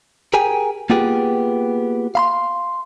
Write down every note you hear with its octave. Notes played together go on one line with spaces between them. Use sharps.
G4 G#4 A#4 G5 G#5
A#3 B3 F4 G4 G#4 B4
F5 B5 C6